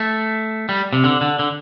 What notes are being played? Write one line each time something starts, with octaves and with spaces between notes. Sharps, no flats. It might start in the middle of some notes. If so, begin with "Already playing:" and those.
Already playing: A3
G3
C3
D3
D3
D3